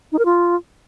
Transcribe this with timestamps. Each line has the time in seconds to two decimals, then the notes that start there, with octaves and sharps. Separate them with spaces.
0.12 D#4
0.19 A#4
0.25 F4